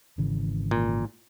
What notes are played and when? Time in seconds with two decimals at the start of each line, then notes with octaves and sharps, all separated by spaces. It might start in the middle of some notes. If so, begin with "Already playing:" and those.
0.18 G#1 C#3 E3
0.71 A#2